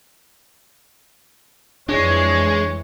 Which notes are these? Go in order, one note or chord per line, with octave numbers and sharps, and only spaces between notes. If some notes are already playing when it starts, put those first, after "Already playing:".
F2 E3 G#3 D4 C#5